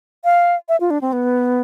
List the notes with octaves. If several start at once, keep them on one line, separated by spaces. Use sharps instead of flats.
F5
E5
F4
D4
C4
B3